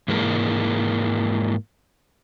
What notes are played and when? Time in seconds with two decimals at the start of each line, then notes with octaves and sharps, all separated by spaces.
0.08 G#2 E3 G#3 A#3